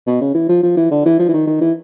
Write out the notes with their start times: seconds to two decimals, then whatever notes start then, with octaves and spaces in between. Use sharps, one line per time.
0.07 B2
0.21 C#3
0.34 E3
0.49 F3
0.63 F3
0.77 E3
0.91 D3
1.06 E3
1.19 F3
1.29 E3
1.34 D#3
1.47 D#3
1.61 E3